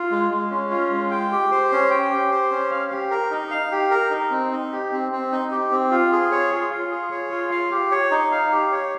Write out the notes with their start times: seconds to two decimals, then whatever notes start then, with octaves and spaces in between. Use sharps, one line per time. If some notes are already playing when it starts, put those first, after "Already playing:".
Already playing: F4
0.11 G#3
0.31 G#3
0.51 C#4
0.71 F4
0.91 G#3
1.11 G5
1.32 G4
1.51 C5
1.72 C#4
1.91 G5
2.11 G4
2.31 C5
2.51 C#4
2.71 F5
2.92 G4
3.11 A#4
3.31 D#4
3.51 F5
3.72 G4
3.91 A#4
4.11 D#4
4.31 C4
4.52 D#4
4.72 G4
4.92 C4
5.12 C4
5.32 D#4
5.52 G4
5.71 C4
5.91 F4
6.12 G#4
6.32 C#5
6.52 F4
6.71 F4
6.91 G#4
7.11 C#5
7.32 F4
7.51 F5
7.72 G4
7.91 C#5
8.11 D#4
8.32 F5
8.52 G4
8.72 C#5